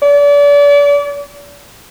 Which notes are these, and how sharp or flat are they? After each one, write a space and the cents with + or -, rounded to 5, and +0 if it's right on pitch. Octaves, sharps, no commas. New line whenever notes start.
D5 -35